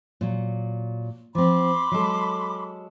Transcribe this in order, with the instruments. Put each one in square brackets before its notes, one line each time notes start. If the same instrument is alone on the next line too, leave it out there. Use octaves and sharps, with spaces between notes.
[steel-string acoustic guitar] A#2 F#3
[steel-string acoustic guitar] F3 C4 [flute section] B5 C6 D6
[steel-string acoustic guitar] F#3 G#3 A4